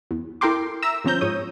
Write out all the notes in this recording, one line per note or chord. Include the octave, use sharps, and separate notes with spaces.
E2
E4 A4 A#4 G5 C6 D6
E5 A#5 E6
G1 F3 C4 C#4 A#5 G6
G#2 F3 C#5 D#6